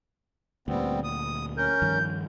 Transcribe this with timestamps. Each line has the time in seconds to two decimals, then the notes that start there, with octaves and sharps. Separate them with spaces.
0.68 D2 A#2 G3 B3 C4
1.04 D#6
1.57 C#4 A#4 G6
1.82 G2 D#3 F3